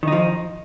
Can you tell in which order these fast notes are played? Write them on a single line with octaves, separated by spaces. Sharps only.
D#3 D#4 F3